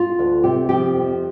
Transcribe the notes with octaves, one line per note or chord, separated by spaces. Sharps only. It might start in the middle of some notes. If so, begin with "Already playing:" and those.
Already playing: F4
D2
C3 G4
F3 G4
F2